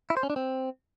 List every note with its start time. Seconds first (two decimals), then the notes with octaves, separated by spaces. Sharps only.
0.10 E4
0.17 C5
0.23 C#4
0.30 D4
0.36 C4